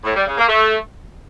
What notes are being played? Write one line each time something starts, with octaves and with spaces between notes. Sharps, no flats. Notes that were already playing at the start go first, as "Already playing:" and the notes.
A2
G3
C#3
A#3
A3